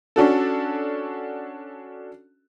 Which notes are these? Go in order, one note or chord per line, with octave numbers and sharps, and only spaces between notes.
C#4 D4 F#4 A4